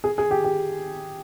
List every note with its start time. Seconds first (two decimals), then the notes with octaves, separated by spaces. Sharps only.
0.04 G#4
0.18 G#4
0.31 G4
0.44 G4